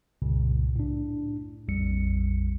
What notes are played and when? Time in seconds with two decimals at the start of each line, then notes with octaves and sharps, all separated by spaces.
0.22 C2 F#2 A#2 C#3
0.76 A2 D4
1.68 A#1 F2 G3 C#7